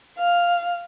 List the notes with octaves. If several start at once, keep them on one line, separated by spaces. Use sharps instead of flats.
F5